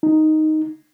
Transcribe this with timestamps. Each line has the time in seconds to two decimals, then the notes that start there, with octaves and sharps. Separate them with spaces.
0.03 D#4